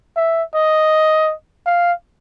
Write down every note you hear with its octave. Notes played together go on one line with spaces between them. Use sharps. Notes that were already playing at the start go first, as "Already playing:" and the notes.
E5
D#5
F5